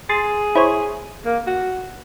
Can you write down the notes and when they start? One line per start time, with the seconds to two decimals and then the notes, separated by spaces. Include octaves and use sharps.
0.09 G#4 C6 A6
0.55 E4 C5 C#5
1.25 A#3
1.47 F#4